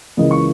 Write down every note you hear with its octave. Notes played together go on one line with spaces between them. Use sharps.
C#2 C#3 E3 A#3 D#5
C#6